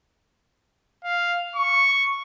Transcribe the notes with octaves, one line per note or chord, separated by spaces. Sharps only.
F5
C#6